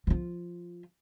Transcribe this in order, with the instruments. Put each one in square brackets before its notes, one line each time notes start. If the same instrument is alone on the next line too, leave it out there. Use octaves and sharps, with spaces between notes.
[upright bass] F3 F4